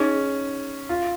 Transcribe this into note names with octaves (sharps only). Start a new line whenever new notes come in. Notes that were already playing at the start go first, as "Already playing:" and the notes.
Already playing: C#4 D#4 G#4 D#5
F4